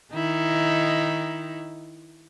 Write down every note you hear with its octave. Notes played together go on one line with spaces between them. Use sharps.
D#3 D#4 E4